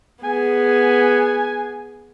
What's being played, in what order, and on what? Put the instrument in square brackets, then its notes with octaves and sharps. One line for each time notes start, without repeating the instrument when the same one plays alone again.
[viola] B3 G#4 [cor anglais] G#5